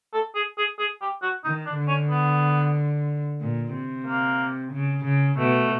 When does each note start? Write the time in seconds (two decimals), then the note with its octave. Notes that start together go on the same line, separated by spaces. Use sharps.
0.13 A4
0.35 G#4
0.58 G#4
0.79 G#4
1.01 G4
1.23 F#4
1.45 D#3 D#4
1.66 D4
1.78 D3
1.88 C#4
2.10 B3
3.41 A#2
3.74 C3
4.06 A#3
4.73 C#3
5.05 C#3
5.38 B2 A3